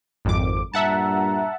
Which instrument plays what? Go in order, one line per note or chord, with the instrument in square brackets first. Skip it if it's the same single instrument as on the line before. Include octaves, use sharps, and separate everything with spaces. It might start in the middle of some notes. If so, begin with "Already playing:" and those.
[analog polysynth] G#1 F2 D6
[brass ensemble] G2 A#2 A#5 [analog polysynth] E5 F#5 A5